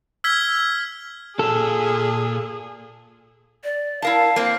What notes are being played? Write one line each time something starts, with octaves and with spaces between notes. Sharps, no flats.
E6 F6 G#6 B6 G7
A#2 F4 G#4 A4
D5
E4 A#4 F5 A5
A#3 C4